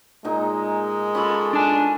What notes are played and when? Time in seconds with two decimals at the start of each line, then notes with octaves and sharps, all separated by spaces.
0.25 A#2 G#3 D#4 A#5
1.15 C#4 F4 A4 B5
1.53 D4 G#5 A5